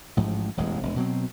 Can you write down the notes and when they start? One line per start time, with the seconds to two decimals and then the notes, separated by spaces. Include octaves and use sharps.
0.17 A1 G#2 F3
0.57 E1 A1 F#2 G#3
0.83 E1
0.96 B2 F#3 C4